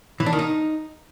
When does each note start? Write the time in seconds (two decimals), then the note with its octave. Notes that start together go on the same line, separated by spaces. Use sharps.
0.20 E3
0.26 D4
0.33 D#3
0.39 D#4